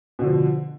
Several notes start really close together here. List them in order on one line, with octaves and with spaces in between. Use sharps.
B2 D3 F3